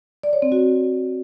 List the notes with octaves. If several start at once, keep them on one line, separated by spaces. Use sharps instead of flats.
D5
C#5
C4
F#4